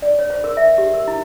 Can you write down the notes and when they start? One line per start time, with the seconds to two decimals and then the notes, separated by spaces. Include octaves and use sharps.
0.02 D5
0.19 C#5
0.30 C5
0.44 A#4
0.57 E5
0.78 G4
0.94 A#4
1.08 E4